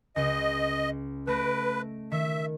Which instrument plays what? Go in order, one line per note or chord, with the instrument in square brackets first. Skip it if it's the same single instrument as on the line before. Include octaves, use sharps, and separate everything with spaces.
[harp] C#2 [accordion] D#5
[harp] A3 A#6 D7 [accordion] B4
[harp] D#3 [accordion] E5